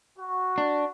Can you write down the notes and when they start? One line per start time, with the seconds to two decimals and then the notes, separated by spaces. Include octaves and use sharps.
0.18 F#4
0.58 D4